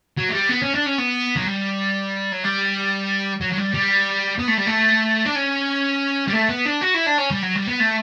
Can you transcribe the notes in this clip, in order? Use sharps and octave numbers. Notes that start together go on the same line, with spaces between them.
F#3
A3
G3
B3
C#4
D4
C#4
B3
F#3
G3
F#3
G3
F#3
F#3
G3
G3
B3
A3
G3
A3
D4
C#4
G3
A3
B3
D4
F#4
E4
D4
C#4
G3
F#3
G3
B3
A3